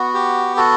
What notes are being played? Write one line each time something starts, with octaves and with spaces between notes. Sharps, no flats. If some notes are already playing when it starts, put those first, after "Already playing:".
Already playing: B3 F#4
G4
F#4 A4